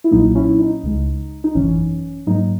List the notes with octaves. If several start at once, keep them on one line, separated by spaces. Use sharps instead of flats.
E4
B1 A#2 F#3 A#3 D#4
C#4 E4
D#4
C#2 C#3 G#3
D#4
G#1 F#2 E3 C#4
G#2 F#3 A#3 D#4